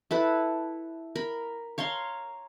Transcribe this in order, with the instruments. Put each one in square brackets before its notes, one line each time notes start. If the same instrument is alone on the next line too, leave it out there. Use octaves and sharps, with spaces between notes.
[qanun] E4 A4 B4
A#4 B5
C#5 F5 A#5 C6